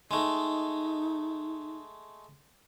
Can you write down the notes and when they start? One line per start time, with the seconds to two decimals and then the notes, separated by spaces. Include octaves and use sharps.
0.11 G#3 A3 D#4